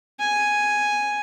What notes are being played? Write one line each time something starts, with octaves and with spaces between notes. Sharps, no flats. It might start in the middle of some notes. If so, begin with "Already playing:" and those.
G#5